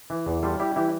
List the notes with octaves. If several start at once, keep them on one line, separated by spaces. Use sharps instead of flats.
E3
E2
G3 F4 A4
G3 E4 G4
E3 E4 G4